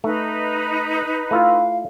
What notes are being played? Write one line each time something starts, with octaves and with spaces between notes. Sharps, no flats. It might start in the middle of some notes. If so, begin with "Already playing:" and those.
A3 D#4 B4
A3 E4 F4 F5